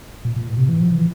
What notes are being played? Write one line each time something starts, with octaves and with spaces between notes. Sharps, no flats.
A#2
A#2
A2
C3
E3
F3
E3